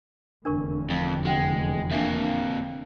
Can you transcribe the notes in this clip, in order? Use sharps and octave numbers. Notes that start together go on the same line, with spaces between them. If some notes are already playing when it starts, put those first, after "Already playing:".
F1 E2 D3 D4 A#4 C#6
F2
G#3 F#4 F#5 G5
F2 A#3 D4 E5